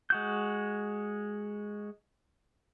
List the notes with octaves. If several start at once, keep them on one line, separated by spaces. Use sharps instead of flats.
G#3 F#4 G6